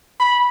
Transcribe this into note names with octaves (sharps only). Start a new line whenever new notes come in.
B5